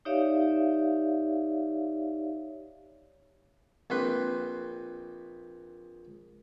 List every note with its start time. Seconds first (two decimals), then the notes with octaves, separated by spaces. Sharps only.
0.05 D#4 G4 C#5 D5 E5 F5
3.90 A#1 C4 B4 C6